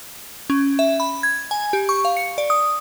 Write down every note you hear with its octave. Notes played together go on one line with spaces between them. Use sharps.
C#4
E5
B5
G#6
G#5
G4
C#6
F5
C#7
D5
D#6